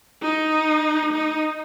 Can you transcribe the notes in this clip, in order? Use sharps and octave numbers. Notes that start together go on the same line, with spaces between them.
D#4
D#4